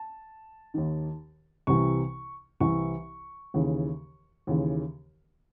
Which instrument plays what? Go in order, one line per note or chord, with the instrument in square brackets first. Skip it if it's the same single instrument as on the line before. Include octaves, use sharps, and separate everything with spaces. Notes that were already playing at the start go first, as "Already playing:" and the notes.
Already playing: [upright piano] A5
D#2 D#3
C2 C3 E3 C#6
C2 C3 E3 C#6
D#2 C#3 E3
D#2 C#3 E3